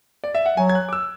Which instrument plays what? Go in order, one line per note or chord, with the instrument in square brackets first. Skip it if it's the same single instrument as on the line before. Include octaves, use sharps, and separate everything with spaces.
[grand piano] D5
E5
F#5
[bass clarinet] F#3 [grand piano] G#5
[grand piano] G#6
F#6
D6
E6